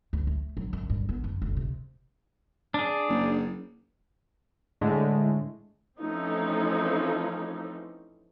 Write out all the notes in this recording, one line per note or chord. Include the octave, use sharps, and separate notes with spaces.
D2
A3
F#3
F#2
G2
B3
F#2
F1
C3
D4 G#4
F#1
A2 D3 G#3 A3
E3 F3 A3 C4 C#4 D#4